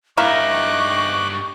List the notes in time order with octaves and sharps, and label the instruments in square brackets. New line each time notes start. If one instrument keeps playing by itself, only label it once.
[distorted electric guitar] G2 D#4 [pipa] A#3 E4 A#4 [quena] C#6 [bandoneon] D6 F#6